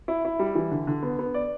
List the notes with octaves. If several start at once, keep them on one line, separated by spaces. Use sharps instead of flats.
E4
E4
G3
E3
D3
D3
B3
B3
D5